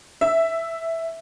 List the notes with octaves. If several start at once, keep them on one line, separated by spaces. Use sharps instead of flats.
E5